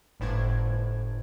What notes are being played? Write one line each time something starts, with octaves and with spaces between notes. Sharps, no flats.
G1 A2 D4 C5 G#6